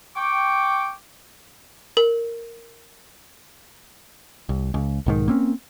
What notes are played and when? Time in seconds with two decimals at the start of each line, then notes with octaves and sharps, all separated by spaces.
0.16 G5 C#6 D6
1.97 A#4
4.49 C2
4.74 C#2
5.06 B1 G#2 D#3
5.28 A#3 C4 C#4